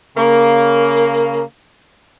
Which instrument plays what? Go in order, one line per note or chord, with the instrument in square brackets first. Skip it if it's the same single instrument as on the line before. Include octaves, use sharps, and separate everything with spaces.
[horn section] C#3 A#3